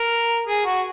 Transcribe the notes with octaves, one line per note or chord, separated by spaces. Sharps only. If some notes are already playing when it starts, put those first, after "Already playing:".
Already playing: A#4
G#4
F#4